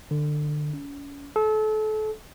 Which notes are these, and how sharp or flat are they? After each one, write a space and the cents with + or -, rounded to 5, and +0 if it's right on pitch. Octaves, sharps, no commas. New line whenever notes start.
D3 +25
C#4 +35
A4 -30